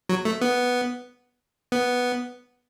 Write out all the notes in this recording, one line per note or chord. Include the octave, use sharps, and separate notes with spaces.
F#3
A3
B3
B3